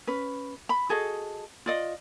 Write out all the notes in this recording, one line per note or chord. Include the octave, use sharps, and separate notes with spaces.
C#4 B4
B5
F#4 G#4 A4 D#5
F4 D5 D#5